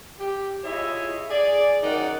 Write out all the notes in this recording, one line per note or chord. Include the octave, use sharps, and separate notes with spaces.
G4
E4 F4 G#4 C#5 D#5 E5
G#4 D5
F#2 D#3 D#4 A#4 D5 F#5